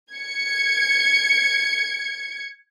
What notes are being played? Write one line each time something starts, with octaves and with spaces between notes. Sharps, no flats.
G#6 C#7